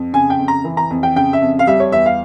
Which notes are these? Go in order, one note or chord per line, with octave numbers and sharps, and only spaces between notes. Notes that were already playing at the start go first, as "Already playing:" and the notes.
Already playing: F2
C#3 G#5
G5
F2
A#5
E3
A#5
F2
G5
C#3 G5
E5
F2
F5
G3 E5
C#5
E2 E5
F5